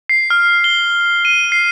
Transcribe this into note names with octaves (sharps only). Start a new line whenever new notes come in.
C7
F6
G7
D#7
C7